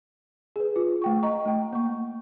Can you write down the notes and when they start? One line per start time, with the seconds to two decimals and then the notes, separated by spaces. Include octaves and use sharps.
0.56 G#4 B4
0.76 F4
1.02 A3 G5 C#6
1.23 D#5 A#5 C#6
1.45 A3 G5
1.73 A#3 C#6